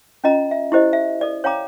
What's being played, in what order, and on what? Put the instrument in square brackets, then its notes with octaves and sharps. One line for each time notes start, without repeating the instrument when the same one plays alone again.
[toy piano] C#4 F4 D#5 A#5
E5
E4 G4 C5 D#5
E5
A4 D5
C#5 F5 G5 A#5 D6